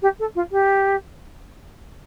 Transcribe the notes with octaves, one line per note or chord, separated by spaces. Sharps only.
G4
A4
F4
G4